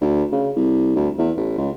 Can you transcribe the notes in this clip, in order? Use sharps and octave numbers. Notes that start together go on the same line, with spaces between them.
D2
C#3
C2
D2
E2
A1
C#2